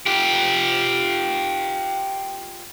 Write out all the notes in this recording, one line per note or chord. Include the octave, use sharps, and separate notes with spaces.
F4 G4